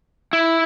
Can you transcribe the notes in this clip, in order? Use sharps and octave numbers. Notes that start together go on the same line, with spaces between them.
E4